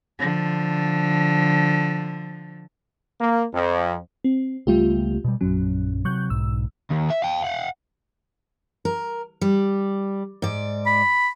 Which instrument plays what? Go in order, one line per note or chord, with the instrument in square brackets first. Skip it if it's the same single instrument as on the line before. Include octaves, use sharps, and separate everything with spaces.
[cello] D3 F3
[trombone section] A#3
F2
[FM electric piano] C4
[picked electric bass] C#2 A3 B3 [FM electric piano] G3 F4 G4
[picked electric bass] B2 G3
[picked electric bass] A#1 F#2 C#4 [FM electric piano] F#3
[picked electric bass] C3 F#3 [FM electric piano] C#6 F#6 G6
[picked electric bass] B1 G#2 [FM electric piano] E6
[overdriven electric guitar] D#2
E5
F5 G5
F5 F#5
[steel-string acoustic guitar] A#4
G3
G#2 D5
[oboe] B5